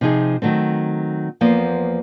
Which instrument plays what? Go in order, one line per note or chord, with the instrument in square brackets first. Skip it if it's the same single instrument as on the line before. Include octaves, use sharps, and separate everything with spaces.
[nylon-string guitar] C3 F3 D#4 G#4
D#3 F#3 A3 C4
E2 F3 A#3 B3 C5